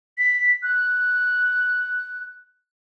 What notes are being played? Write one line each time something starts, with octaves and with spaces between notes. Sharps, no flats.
B6
F#6